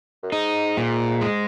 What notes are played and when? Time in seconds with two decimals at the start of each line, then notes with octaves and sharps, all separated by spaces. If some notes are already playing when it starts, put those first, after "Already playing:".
0.23 F#2
0.32 G#2 D#4
0.77 A#2
1.21 G#3